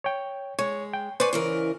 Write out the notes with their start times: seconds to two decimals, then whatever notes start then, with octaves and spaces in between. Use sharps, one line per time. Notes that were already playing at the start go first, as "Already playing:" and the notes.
0.04 C#5 G5
0.59 G#3 C#5
0.94 G5
1.20 B4 C5 D5 G#5 C#6
1.33 C#3 E3 A#4